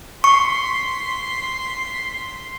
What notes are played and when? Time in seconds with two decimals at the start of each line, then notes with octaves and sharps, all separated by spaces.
0.24 C6 C#6 B6 C7